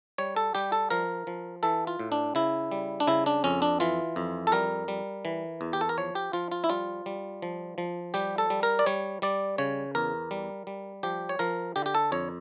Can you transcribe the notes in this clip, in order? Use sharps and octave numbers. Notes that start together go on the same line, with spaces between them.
G3 C#5
A4
G3 G4
A4
F3 A#4
F3
E3 A4
F4
A2
D4
C#3 E4
G3
D4
C#3 E4
D4
F2 C#4
D4
E3 F4
F2
A4
G3 A#4
G3
E3
E2
G4
A4
A#4
F3 C#5
G4
F3 F4
F4
E4
G3 F4
G3
F3
F3
G3 G4
A4
G3
A#4
D5
G3 C#5
G3 D5
C#3 C#5
E2 A#4
G3
G3
F3 G4
C#5
F3 A#4
D3 G4
G4
A4
F2 C#5